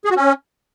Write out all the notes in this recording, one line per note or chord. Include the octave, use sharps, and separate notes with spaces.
G#4
F#4
C#4